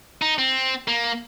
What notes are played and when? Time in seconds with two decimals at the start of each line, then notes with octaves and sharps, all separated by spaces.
0.22 D#4
0.38 C4
0.88 A#3